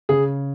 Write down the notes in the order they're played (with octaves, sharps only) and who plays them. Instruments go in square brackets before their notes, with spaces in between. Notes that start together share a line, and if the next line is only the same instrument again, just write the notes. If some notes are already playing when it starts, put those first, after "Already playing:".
[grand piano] C#3 [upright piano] G#4